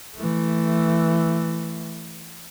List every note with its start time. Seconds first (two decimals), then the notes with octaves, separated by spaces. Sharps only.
0.16 E3 A3